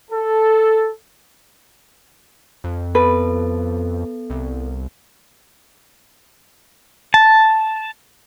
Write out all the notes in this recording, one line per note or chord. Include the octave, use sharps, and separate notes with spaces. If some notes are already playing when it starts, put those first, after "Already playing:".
A4
F2
B3 A4 B4 A5
C2
A5